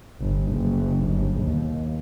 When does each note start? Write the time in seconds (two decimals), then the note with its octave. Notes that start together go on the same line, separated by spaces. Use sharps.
0.20 G1
0.51 F#1
1.06 G1
1.41 D#2